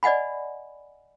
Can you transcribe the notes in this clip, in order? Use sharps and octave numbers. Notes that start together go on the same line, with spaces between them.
D5 D#5 F#5 G#5 B5